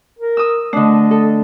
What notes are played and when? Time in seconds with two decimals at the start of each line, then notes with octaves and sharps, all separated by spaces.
0.19 A#4
0.37 D#6 E6
0.73 D3 A3 D4 D#5
1.11 A4